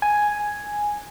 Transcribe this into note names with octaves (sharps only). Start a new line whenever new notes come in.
G#5